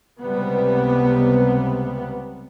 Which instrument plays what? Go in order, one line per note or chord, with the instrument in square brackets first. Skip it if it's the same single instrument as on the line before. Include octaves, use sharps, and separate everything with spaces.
[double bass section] C#2 C3 G3 B3